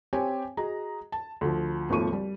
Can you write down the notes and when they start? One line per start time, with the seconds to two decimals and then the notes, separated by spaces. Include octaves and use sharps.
0.13 C4 G4 C#5 G5 G#5
0.57 F#4 G#4 D#5 A#5
1.12 A5
1.41 D2 F3
1.90 G#1 D#2 F3 A3 C#6 D#7
2.13 G3